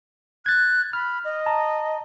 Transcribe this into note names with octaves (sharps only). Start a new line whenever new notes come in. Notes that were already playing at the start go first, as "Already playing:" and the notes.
F#6 G#6 A6
B5 F6
D#5
A5 A#5